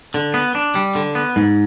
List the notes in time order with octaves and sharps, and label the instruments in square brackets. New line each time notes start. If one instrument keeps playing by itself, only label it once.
[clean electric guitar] D3
B3
D4
G3
D3
B3
G#2